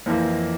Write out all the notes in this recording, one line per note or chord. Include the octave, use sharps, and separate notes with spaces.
F2 E3 A#3 E4